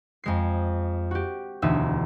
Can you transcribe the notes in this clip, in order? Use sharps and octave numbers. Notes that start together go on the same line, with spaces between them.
F2 G#3 C7
F#4 G4
E1 D2 D#4 E5 E6